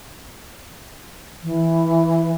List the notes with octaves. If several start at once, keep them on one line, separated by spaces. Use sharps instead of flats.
E3